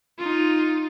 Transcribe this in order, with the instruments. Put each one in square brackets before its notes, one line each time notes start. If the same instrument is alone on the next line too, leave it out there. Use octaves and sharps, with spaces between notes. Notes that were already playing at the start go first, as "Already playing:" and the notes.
[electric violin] D#4 F4